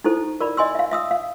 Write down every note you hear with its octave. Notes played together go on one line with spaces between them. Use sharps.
D#4 E4 A4 C5
A#4 D5 B5
D5 D#5 G#5 C6 E6
E5 F5
E5 D#6 E6
F5